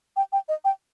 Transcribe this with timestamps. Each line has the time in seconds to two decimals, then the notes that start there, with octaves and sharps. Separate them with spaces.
0.16 G5
0.32 G5
0.49 D#5
0.65 G5